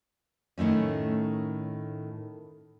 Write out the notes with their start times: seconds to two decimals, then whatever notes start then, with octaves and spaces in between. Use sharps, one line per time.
0.58 A2 D#3 A3 C#4